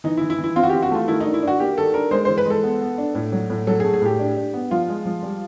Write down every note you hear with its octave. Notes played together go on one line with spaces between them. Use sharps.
E3 D#4
E4
E3
E4
E3
E4
C4 F4
F#4
E3 G4
F#4
A3 F4
D#3 E4
D#4
D4
E4
D4 F#4
A#3 G4
D#3 A4
D4 A#4
G#3 C5
E3 C5
B4
G#3 A4
B3
B3
D4
A2
F#3
A2
F#3 A4
G#4
A3
G#4
A2 G4
D4
D4
B3
F3 F4
G#3
F3
G3